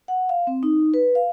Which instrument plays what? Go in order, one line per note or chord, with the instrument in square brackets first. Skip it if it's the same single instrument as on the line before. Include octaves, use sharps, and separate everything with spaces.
[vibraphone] F#5
F5
C4
D#4
B4
F5